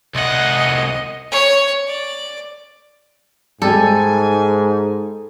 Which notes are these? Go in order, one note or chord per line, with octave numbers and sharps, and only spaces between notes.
C2 D#5 F#5
C#5
D5
G#2 G3 A4 G#5